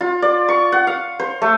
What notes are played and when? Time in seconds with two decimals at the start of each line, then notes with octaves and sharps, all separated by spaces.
0.01 F4
0.22 D5
0.49 C#6
0.72 F#5
0.87 F5
1.20 C5
1.42 A3